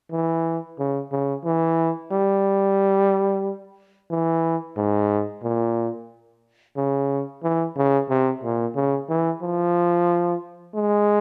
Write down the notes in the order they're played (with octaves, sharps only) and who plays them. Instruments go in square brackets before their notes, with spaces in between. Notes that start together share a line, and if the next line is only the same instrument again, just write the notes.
[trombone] E3
C#3
C#3
E3
G3
E3
G#2
A#2
C#3
E3
C#3
C3
A#2
C#3
E3
F3
G#3